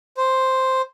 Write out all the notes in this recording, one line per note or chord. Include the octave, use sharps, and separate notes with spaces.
C5